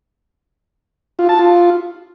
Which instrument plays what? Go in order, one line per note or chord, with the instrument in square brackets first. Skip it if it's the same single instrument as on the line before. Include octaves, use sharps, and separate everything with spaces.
[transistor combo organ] F4
A5
F4